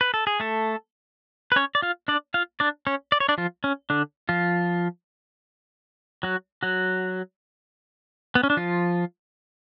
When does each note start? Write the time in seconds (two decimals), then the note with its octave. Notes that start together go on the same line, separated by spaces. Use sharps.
0.01 B4
0.14 A4
0.27 G#4
0.40 A3 A4
1.52 B4
1.56 C#4 C#5
1.75 D5
1.82 F4 F5
2.08 D4 D5
2.34 F4 F5
2.60 D4 D5
2.87 C#4 C#5
3.12 D5
3.20 C#5
3.29 D4 D5
3.38 F3 F4
3.64 C#4
3.90 D3 D4
4.29 F3 F4
6.23 F#3 F#4
6.63 F#3 F#4
8.35 B3
8.43 C#4
8.50 D4
8.57 F3 F4